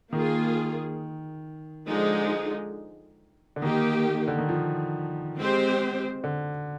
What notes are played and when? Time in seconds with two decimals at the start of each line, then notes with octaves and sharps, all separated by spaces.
0.13 D#3 A#3 F4 G#4
1.88 D3 F3 G#3 D#4 G#4
3.56 D3
3.62 D#3 A#3 D#4 G4
4.28 D3
4.39 D#3
4.49 F3
5.37 G#3 C4 G4 C5
6.24 D3